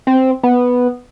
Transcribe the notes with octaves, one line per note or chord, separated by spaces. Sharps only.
C4
B3